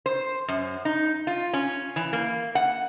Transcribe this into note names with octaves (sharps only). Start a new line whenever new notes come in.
C5
F#2
D#4
F4
C#4
E3
A#3
F#5